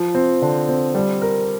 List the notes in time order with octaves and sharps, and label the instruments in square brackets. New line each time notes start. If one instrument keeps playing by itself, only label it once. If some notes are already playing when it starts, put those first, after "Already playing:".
Already playing: [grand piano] F3
C4
D3
C4
G3
A#4